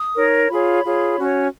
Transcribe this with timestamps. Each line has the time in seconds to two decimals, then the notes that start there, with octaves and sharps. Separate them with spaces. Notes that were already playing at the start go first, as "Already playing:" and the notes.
Already playing: D#6
0.15 D#4 A#4 C#5
0.49 F4 G#4 C#5 B5
0.84 F4 G#4 C#5
1.18 C#4 F#4 C#5